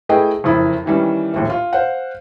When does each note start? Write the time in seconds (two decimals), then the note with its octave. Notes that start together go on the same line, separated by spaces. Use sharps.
0.09 A3 E4 G#4 B4 D#5 G5
0.44 F#1 F2 E4 D#6
0.86 D#3 E3 G3 C#4
1.34 A#1 D#2 A2
1.50 F4
1.73 C5 F5 F#5